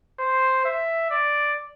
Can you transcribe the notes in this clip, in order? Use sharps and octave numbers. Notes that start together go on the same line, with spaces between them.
C5
E5
D5